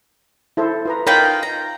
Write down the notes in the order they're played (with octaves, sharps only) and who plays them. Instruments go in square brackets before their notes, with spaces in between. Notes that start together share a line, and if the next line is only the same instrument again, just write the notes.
[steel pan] E4 A4 C5
F4 B4 A#5
[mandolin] D#4 F4 G5 [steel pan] A#4 C#5 B5
[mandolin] A#5